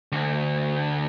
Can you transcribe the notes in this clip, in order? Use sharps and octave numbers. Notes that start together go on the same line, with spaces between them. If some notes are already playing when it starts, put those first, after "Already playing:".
D2